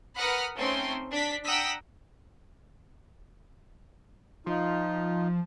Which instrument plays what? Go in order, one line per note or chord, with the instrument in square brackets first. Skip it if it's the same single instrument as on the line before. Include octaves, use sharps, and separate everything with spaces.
[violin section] A#4 B4 F#5 B5 D#6 F6
A3 C4 C#4 D#4 C6
D4 B6
F#5 G5 A#5 D#6 E6 B6
[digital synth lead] F3 [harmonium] D#4 F4